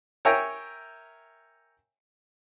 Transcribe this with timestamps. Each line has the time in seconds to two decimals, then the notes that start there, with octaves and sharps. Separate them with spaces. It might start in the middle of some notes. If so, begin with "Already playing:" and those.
0.25 A#4 C#5 E5 G5 G#5 A#5